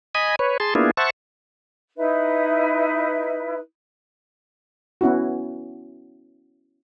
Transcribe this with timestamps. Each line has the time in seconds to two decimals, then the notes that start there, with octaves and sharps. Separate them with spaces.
0.15 D#5 G#5 B5
0.39 B4 C#5
0.60 G#4 A5 C6
0.75 A#3 B3 D4 E4 F4 G#4
0.97 C5 E5 F#5 A5 C#6
1.97 D#4 E4 B4 E5
5.01 B3 C#4 E4 F#4